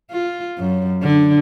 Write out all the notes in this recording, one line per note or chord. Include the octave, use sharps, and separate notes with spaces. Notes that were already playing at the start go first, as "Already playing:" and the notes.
F4
F#2
D3